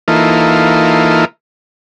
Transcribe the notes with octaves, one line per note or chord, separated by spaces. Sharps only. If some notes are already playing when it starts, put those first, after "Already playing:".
E3 A#3 D#4 F4 A4